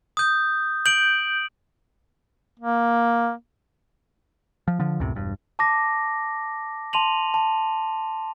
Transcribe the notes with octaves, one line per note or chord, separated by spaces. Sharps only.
D#6 G6
G6 D7 F#7
A#3
F3
D3 F3
C#2 F#2 A2 C3
E1 G2
A5 D6 A#6
A5 C6 D#7 F7 F#7
A5